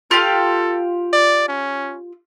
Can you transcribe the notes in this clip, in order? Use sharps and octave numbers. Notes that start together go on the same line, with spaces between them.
F4 G4 A4 F5
D5
C#4